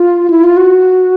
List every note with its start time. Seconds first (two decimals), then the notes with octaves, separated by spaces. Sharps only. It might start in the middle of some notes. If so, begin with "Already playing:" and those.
Already playing: F4
0.30 E4
0.44 F4
0.57 F#4